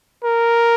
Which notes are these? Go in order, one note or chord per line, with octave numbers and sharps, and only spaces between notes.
A#4